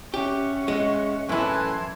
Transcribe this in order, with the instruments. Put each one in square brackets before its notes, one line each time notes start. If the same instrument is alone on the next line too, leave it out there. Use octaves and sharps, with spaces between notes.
[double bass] C#4 [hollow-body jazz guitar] G4 [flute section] E5 F#5 C#6
[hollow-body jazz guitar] G#3
[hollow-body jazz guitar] F#2 E4 [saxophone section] A2 E3 [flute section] A5 C6 G#6